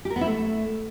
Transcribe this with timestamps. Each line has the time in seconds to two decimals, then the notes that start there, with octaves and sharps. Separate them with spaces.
0.05 G4
0.10 A#4
0.16 B3
0.21 E4
0.27 A3